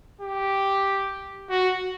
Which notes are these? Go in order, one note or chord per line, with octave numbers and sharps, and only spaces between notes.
G4
F#4